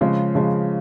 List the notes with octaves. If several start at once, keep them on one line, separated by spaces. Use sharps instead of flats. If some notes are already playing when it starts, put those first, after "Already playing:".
C#3 F3 G#3
C#3 F3 G#3